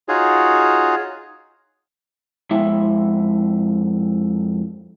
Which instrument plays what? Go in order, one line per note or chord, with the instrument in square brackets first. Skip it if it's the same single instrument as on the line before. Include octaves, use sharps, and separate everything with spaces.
[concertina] D#4 F4 F#4 G#4 C#5
[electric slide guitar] F2 G#3 E4 E5